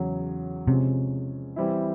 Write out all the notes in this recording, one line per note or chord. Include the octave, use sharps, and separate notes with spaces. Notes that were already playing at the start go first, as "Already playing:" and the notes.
Already playing: E2 C#3 F#3
C3 F3 G#3 C#4
E3 G3 C4 E4